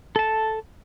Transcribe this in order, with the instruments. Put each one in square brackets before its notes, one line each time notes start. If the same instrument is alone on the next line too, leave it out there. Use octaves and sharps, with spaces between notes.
[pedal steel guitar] A4 A5